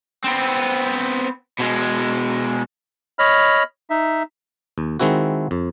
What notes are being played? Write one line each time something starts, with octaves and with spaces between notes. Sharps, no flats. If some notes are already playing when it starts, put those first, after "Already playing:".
B3 C4
B2 G#3
C#5 D#5 B5 F6
D#4 E5
D#2
D#3 G#3 C4 E4 F#4
F2